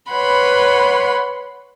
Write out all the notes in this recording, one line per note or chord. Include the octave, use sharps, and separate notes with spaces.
B4 C#5 F#5 B5 C6